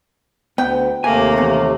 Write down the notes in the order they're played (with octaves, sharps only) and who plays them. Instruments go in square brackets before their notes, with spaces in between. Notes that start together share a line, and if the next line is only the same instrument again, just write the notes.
[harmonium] D2 [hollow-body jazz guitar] B3 [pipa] G5
[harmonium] D#2 C3 A3 [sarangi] A#3 [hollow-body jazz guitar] G#5
[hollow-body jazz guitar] E2 B3